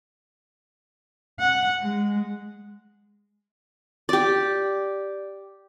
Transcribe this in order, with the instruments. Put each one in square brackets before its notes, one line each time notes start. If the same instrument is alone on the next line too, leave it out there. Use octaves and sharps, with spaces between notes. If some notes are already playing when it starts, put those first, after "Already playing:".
[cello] F#5
G#3
[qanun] G4 D5